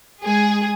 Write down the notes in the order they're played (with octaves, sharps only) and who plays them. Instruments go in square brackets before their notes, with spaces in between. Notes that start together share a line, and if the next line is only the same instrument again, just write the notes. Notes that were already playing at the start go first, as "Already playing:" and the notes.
[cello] G#3 [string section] G#4